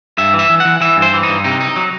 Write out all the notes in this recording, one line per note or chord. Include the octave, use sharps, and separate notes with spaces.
G2 E5
E3
E5
E3
F#5
E3
E3 E5
G2
C5
E3
D#4
G2
C3 D#4
D#4
F#3